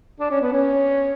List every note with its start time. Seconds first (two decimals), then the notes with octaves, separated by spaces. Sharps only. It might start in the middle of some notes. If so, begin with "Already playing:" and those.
0.20 D4
0.31 C#4
0.41 B3
0.53 C#4